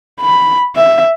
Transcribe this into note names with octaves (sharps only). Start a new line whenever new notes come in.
B5
E5